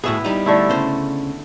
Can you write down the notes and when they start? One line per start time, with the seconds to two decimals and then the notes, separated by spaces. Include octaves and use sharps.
0.04 A2 B3 E4 F#4 G#4
0.25 G3 D#4
0.46 D3 A3 E4
0.70 C#3 C5